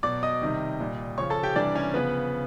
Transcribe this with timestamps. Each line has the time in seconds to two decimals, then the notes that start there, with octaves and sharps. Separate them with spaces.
0.03 B2 F#3 D5 D6
0.23 D#5 D#6
0.41 C3 D#3 G3
0.80 A#2 G3
1.18 C#3 F3 C#5 C#6
1.30 A4 A5
1.43 G4 G5
1.56 C3 E3 G3 D4 D5
1.75 C#4 C#5
1.94 C#3 F3 B3 B4